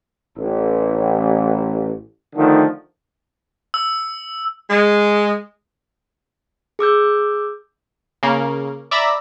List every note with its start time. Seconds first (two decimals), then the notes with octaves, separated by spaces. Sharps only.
0.38 A1
2.36 D3 D#3 F3 A3
3.74 E6
4.70 G#3
6.79 G#4 D6 E6 G6
8.23 C#3 A#3
8.91 D5 E5 A#5 B5